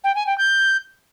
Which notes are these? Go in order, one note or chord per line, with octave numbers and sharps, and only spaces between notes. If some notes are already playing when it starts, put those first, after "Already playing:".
G5
G#5
G5
G6